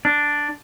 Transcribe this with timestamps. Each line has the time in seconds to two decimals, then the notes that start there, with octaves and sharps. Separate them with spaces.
0.05 D4